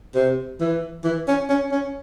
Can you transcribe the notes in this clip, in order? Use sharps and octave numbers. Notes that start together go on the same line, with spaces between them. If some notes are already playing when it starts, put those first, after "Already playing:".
C3
E3
E3
C#4
C#4
C#4